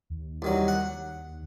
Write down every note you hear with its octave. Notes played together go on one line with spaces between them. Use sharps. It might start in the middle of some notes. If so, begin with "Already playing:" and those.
D#2
C2 D#3 F#3
F#5